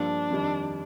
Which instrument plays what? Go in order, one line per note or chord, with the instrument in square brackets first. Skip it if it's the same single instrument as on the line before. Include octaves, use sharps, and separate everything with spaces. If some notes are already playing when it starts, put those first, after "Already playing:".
Already playing: [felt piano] G2 F3 A#3 [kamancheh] D4
[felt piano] F2 D#3 G3